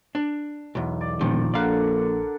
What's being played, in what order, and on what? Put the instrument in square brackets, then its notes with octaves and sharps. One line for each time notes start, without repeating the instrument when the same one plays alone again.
[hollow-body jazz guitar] D4
B1 E2
[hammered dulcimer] D5
[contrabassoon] E1 [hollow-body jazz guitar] A#2 D#3 F3
[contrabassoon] A#1 [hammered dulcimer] D3 A#4 F#5 [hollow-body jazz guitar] D5 F5